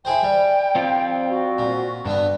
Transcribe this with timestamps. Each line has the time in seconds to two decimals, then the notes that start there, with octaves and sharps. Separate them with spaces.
0.05 E4 G#4 C5 G5
0.23 G3
0.75 C4 F4
1.29 F#4
1.59 A#2
2.06 G2 D3 B3